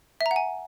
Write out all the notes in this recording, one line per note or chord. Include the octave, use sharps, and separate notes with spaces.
E5
A#5
F#5
G#5